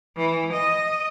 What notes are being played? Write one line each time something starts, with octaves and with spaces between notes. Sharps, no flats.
E3
D#5